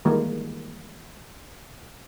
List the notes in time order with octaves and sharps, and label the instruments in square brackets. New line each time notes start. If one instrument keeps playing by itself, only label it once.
[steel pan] D#3 E3 G3 G#3 A#3 A#4